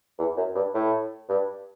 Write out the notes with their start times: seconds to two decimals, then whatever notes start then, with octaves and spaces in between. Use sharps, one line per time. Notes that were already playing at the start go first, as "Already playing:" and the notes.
0.19 E2
0.37 F#2
0.55 G2
0.74 A2
1.29 G2